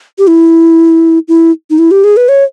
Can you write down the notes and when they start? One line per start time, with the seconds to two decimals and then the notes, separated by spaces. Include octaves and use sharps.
0.19 G4
0.28 E4
1.28 E4
1.70 D#4
1.78 E4
1.91 G4
2.04 G#4
2.17 B4
2.29 C#5